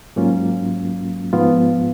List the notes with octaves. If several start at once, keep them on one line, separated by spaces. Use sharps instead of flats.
G#2 F#3 A#3 C#4 F4
G#2 F3 B3 F4